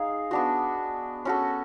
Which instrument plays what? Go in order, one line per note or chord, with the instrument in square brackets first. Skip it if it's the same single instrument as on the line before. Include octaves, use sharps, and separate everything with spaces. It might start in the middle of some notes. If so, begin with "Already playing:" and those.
Already playing: [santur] D#4 G#4 F5
B3 D4 F#4
C#4 F#4 A4